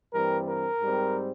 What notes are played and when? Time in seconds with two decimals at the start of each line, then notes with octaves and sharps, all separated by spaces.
0.13 G2 E3 G3 C4 A#4
0.48 A#4
0.81 G#2 G3 C4